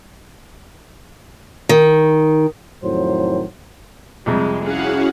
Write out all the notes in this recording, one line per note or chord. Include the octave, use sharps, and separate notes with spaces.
D#3
F2 A2 D#3 F#3 C5
F2 C3 G3 G#3
C#4 E4 F#4 G#4 F5 F#5